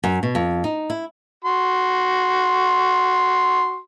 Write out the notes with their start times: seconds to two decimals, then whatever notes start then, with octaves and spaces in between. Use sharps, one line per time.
0.04 F#2
0.23 B2
0.35 F2
0.64 D#4
0.90 E4
1.45 F#4 C6